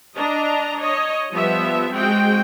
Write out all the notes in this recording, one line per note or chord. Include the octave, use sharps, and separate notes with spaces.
D4 D#5 A#5
C#5 D#5
F3 G3 B3 E5
G#3 C4 F#4 G5